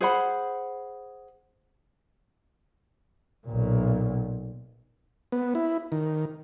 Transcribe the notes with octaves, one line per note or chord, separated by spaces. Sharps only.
G#4 C5 F#5 B5
B1 A#2
B3
E4
D#3